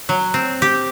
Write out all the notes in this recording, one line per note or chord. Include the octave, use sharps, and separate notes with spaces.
F#3
C4
G4